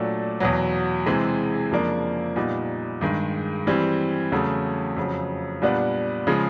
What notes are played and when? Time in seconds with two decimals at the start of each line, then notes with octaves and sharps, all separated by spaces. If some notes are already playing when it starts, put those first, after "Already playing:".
Already playing: A#2 F#3 A3 D4
0.40 E2 B2 F#3
1.06 C3 E3 G#3 C4
1.71 F2 C#3 F3 A#3 D4
2.36 A#2 G3 B3 D#4
3.01 G2 D#3 G#3
3.67 E3 G3 C4
4.32 E2 C#3 F#3 A3
4.97 F2 C#3 F#3
5.62 A#2 G3 B3 D4
6.27 C#3 F3 G#3